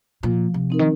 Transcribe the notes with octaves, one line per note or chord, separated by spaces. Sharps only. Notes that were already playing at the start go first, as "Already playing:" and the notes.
A#2 F3
C3
C4 D#4 A#4
D#3